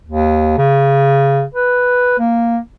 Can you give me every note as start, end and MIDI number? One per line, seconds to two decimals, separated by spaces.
0.06 0.54 39
0.58 1.43 49
1.54 2.16 71
2.18 2.58 58